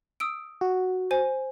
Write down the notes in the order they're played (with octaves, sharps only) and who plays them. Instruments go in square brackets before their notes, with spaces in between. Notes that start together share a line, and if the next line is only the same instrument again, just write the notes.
[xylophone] D#6 E6 D7
[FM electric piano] F#4
[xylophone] C5 G#5 D#7